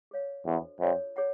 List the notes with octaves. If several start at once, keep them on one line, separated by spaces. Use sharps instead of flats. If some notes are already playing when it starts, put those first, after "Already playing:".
G#4 C#5 F5
E2 D4 F#4 A4 C5 D#5
F2 F4 A4 C#5
G#4 C#5 F#5 A#5